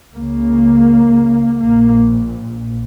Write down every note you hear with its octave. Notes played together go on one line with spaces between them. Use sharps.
C#2 C#3 A#3
A#1 A#2 A#3